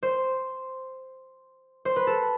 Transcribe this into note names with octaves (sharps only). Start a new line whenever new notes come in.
C5
C5
B4
A4